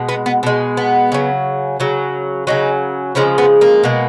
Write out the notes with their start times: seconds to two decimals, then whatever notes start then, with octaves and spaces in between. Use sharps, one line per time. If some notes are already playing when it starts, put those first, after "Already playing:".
Already playing: B2 G#3
0.09 B3
0.26 B3
0.43 B2 G#3
0.77 B3
1.12 C#3 F#3
1.80 C#3 F#3
2.47 C#3 F#3 D#4
3.15 C#3 F3 G#3 C#4
3.38 B3
3.61 A#3
3.83 B2 G#3